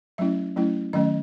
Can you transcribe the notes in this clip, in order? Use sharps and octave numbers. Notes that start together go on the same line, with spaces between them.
F#3 A3 C#4 E4 E5
F#3 A3 C#4 E4
D#3 F#3 A3 C#4 D#5